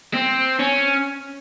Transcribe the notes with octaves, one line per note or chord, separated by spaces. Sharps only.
C4
C#4